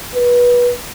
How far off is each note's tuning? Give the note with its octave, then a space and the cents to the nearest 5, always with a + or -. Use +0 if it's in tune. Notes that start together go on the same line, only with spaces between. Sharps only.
B4 -25